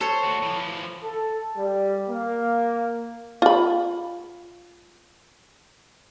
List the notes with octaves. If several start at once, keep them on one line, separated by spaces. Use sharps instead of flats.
A4 C5 C#5
A3 F#4
E3 F3
A4
G3
A#3
F4 B5